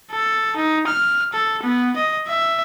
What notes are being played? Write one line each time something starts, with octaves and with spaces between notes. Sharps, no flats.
A4
D#4
F6
A4
B3
D#5
E5